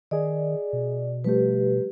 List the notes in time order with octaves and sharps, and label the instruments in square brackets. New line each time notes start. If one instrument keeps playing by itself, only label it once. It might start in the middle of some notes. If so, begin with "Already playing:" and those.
[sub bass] D#3 [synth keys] G#4 D#5 [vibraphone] D5
[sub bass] B2
[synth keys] F3 G3 A3 [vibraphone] G4 B4